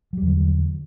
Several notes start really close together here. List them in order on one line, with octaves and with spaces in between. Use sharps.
F#3 G3 E2 D3